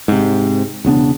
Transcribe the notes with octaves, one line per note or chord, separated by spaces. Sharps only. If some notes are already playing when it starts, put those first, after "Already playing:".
G#2 C3
E1 C#3 B3 D4